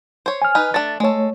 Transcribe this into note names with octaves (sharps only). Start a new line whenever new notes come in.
C5 C#5
G#5 F6
D#4 B4
A3 D4 A6
G#3 A3 A4 C#5